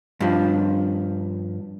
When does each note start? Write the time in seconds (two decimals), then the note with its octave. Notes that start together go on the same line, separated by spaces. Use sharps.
0.20 G2 F3